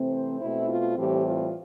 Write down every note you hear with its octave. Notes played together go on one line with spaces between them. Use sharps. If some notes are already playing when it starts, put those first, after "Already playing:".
Already playing: C3 E3 A3 C4
C5
B2 A3 C4 E4
F4
A2 E3 G3 C4 G4
F4